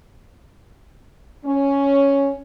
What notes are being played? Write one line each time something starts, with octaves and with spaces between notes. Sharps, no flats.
C#4